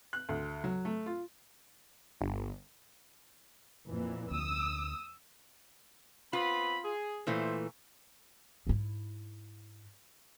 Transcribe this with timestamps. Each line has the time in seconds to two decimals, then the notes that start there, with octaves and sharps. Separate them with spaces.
0.13 F#6
0.29 D2
0.64 F#3
0.85 A3
1.06 F4
2.21 G1
3.88 F2 A#2 E3
4.31 D2 D#6 E6
6.33 B3 C4 F4 B5
6.84 G#4
7.27 A#2 E3 A3 C5
8.67 G#2 E4